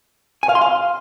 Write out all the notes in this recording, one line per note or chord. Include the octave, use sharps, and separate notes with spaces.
G#5
F5
C6
F5